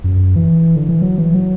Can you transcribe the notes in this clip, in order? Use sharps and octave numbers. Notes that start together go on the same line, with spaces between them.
F#2
E3
D3
E3
F#3
E3
F#3